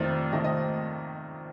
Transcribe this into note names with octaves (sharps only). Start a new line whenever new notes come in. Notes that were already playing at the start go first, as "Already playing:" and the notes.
Already playing: F2 C3 D#3 A3 C4 D5
F2 C3 D#3 A3 C4 D#5
D#5